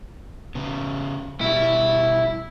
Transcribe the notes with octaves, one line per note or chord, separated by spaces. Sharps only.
C#3 B3
B2 G3 E4